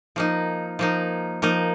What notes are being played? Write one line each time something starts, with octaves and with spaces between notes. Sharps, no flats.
F3 A#3 D#4
F3 A#3 D#4
F3 A#3 D#4